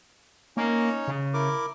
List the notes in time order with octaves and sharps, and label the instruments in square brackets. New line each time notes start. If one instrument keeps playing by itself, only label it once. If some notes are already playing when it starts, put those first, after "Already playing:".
[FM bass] A#3 [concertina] C#4 D#4 C#5
[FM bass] C#3
[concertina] E4 A#4 D6